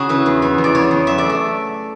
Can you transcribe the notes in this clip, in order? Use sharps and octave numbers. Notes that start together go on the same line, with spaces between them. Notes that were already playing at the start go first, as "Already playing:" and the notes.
Already playing: C#3 F#4 G#4
E3 B4
E2
E3
E2
D5
C#3 C#5
E2
F#3 E5
A3 D5
E5